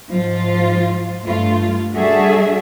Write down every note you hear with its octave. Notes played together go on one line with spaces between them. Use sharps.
G#2 F3 F4
G2 A3 F4
G3 D4 F#4 G#4 A4 E5